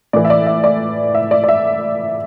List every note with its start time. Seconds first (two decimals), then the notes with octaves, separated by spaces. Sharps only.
0.13 A2 E3 D5
0.25 E5
0.30 D5
0.46 E5
0.64 D5
1.15 E5
1.31 D5
1.44 D5
1.48 E5